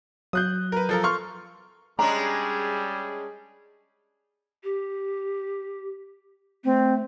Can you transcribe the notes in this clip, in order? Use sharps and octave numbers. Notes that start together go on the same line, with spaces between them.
F#3 D#6 F#6 G6
A#4 B4
F3 A4 A#4
C6 C#6 F6
G3 G#3 C#4 D4 G#4 A#5
G4
A3 C4